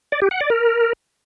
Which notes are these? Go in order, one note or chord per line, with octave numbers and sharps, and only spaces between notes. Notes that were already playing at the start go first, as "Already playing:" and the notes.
D5
G4
F#5
D5
A#4